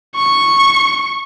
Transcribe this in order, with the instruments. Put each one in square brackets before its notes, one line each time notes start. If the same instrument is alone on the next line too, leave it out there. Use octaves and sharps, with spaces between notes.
[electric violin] C#6